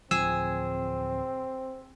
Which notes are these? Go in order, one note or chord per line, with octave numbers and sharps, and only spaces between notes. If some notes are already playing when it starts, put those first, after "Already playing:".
D1 F3 C4 G#4 E6